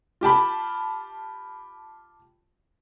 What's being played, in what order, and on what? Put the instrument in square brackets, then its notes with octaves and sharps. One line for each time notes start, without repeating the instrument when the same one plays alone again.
[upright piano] F4 G4 A5 B5